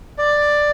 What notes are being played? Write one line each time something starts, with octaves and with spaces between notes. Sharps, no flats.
D5